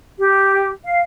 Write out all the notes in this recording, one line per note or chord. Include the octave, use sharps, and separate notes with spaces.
G4
F5